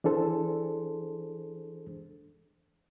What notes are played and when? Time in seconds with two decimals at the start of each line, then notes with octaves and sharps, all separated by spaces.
0.04 E3 D4 G#4 A4 C5